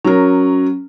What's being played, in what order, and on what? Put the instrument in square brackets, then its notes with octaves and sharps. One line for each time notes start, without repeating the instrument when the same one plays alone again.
[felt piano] F#3 A#4 [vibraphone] C#4